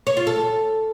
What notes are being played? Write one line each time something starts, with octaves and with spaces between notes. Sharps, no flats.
C#5
F4
A4